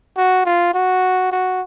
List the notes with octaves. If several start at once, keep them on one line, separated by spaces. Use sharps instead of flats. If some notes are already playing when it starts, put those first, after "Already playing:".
F#4
F4
F#4
F#4